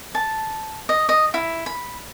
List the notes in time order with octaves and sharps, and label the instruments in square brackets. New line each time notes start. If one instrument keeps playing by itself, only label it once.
[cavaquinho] A5
D#5
D#5
E4
B5